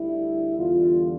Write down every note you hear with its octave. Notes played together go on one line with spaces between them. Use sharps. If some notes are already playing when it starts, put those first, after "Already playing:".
Already playing: D2 D3 G3 E4
E2 D3 G3 F4